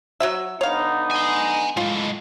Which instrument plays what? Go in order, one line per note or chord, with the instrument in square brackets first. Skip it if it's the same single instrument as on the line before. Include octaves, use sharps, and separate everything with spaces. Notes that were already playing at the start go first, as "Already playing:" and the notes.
[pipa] F#3 F#4 E5
[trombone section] D3 B3 D#4 [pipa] C#5 F5
[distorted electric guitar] G#5 C6
[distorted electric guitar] A2 G#3 [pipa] F4